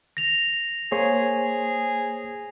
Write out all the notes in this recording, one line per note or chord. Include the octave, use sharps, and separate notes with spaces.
A#6 F7
A#3 G#4 C5 C#5